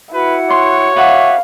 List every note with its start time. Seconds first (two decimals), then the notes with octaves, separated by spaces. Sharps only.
0.14 E4 F#4 B4 F#5
0.50 C#5 C6
0.96 F#4 B4 D5 E5 F5